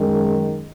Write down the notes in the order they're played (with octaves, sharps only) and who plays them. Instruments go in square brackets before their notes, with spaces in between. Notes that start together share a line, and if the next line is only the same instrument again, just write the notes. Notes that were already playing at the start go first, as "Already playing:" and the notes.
Already playing: [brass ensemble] F#2 D#3 G#3